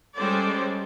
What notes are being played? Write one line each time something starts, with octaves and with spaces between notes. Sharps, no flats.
G3 G#3 C#4 A4 C5 D5